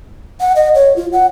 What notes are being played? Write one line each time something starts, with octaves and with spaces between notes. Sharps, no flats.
F#5
D#5
C#5
F4
F#5